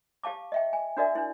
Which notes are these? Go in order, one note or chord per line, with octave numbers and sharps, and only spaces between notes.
G4 F5 A5 D6
D#5 E5 G5
G#5
D4 F#4 A#4 D5 E5
D4 E4